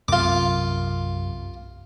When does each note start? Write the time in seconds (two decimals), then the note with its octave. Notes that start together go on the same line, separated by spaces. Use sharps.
0.08 B1 F#2 C3 F4 D6